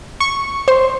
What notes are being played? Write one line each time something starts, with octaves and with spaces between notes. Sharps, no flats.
C#6
C5 C6